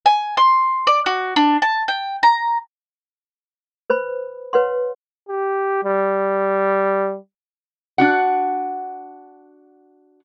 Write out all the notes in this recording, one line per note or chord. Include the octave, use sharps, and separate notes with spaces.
G#5
C6
D5
F#4
D4
A5
G5
A#5
B4 C5 B5
B4 C#5 F#5 C6
G4
G3
D4 F#4 F#5